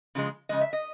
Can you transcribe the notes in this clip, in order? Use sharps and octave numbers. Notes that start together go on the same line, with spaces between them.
C#3 F3 G#3
C#3 F3 G#3 D#5
E5
D#5